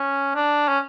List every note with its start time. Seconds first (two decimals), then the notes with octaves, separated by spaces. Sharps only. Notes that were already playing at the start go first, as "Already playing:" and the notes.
Already playing: C#4
0.35 D4
0.68 C#4